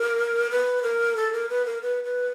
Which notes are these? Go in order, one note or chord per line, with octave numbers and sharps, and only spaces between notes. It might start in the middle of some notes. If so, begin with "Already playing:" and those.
Already playing: A#4
B4
A#4
A4
A#4
B4
A#4
B4
B4